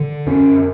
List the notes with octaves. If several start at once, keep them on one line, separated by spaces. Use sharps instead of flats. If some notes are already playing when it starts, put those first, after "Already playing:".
Already playing: D3
F#2 C#4